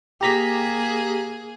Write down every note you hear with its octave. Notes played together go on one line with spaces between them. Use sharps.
A#3 G4 G#4 A#5 B6